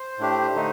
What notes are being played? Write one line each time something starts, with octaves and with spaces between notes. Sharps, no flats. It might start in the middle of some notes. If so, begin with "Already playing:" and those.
Already playing: C5
A2 A3 D4 G4
D3 A3 D#4